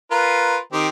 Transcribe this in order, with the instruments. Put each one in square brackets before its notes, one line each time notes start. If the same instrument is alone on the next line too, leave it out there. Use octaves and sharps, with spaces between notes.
[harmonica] F4 A#4 B4
D#3 C4 G4